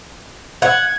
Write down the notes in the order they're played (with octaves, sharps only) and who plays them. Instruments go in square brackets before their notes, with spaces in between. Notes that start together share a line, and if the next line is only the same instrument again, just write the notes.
[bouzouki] F#5 [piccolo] G#6